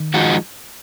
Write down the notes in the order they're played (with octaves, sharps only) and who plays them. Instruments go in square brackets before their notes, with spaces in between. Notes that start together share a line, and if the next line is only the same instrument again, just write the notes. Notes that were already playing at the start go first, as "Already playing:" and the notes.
Already playing: [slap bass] D#3
[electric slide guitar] F3 G#3 D#4 F#4